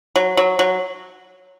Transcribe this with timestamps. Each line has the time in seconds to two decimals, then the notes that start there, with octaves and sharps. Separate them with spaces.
0.16 F#3
0.37 F#3
0.59 F#3